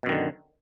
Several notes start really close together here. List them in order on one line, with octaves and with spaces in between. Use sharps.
B2 F#2 D#3 D3